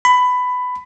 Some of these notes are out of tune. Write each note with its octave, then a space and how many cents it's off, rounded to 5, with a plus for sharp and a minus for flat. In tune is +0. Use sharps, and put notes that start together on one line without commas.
B5 +15